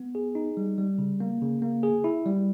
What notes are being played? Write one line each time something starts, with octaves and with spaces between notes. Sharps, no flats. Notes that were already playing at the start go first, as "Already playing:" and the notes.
Already playing: B3
G#4
D#4
G3
G3
C#3
A#3
C#3
A#3
G#4
E4
G3